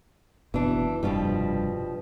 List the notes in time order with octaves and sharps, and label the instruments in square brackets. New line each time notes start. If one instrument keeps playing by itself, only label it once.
[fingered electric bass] F#1 B2 [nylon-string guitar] E3 D4
[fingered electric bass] F1 G2 [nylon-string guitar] B2 F3 G3